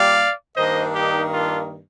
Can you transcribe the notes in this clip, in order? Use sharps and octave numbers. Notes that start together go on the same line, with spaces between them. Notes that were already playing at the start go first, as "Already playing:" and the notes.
Already playing: A#2 G3 A#3 D5 F5
G2 D#3 A#3 D4 C5 D#5
D#4 G4
D4 F4